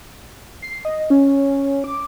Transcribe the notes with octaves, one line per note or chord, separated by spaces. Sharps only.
C7
D#5
C#4
D6